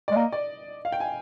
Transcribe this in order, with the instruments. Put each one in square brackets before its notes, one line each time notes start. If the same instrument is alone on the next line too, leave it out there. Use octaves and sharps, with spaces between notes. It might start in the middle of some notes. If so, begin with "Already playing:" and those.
[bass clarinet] G#3 [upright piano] D5
[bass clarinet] A#3 [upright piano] D#5
[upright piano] D5
F5
G5
G#5